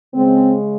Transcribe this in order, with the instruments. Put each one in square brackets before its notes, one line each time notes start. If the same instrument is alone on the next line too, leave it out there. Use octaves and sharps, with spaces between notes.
[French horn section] C#3 G#3 C4